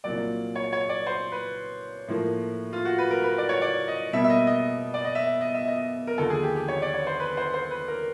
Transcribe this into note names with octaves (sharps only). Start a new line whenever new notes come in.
C2 A#2 F#3 A#3 D5
C#5
C#5
D5
C5
B4
A2 F3 A#3
F4
F#4
B4
A#4
B4
D5
C#5
D5
D#5
B2 G3 A#3 E5
E5
D#5
D#5
D5
D#5
E5
D#5
E5
D#5
A#4
D#2 D3 F3 A4
G#4
G4
G4
C#5
D5
C#5
C5
B4
C5
C5
B4
A#4